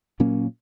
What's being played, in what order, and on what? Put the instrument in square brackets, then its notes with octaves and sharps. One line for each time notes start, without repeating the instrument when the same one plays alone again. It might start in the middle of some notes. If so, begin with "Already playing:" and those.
[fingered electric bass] A#2 F#3 A#3 C#4